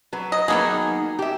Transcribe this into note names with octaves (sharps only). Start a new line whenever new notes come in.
F#3 B4
D#5
D#3 F#3 A#3 B3 D#4 G#4
G4 E5